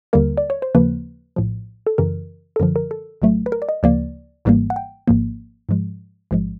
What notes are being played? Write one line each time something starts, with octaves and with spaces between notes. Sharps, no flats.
D#2 D3 G3 A#3 A#4
D5
C#5
C5
D#2 C#3 F3 A#3 B4
A#1 A2 F3
A4
F#2 C#3 E3 A#4
A4
F#2 D3 F3 A#4
A#4
A4
A#1 A2 F#3 A3
B4
A#4
D5
D#5
D2 C#3 F3 A#3 D5
G#1 G#2 E3 G3 A#3
F#5
G5
G#1 G#2 F3 A#3
G#2 F3 G#3
A1 G#2 F3 G#3